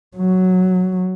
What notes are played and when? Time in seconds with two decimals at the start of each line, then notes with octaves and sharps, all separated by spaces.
0.17 F#3